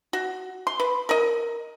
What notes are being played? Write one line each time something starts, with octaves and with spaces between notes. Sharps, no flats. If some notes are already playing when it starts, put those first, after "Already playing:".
F#4
C6
B4
A#4 D#5